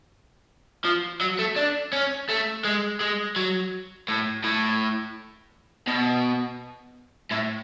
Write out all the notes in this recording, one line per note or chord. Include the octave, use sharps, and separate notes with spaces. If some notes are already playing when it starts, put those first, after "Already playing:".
F3
F#3
A3
D4
C#4
A3
G#3
G#3
F#3
A2
A2
B2
A2